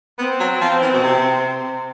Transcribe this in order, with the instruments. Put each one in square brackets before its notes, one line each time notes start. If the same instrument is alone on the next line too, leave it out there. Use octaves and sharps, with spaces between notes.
[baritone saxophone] B3 [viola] C4
[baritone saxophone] F#3
F3
E3
B2
C3